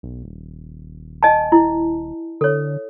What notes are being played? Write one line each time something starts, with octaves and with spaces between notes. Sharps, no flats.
B1
D#1
D#5 G#5 A5
E4
D3 A4 C#5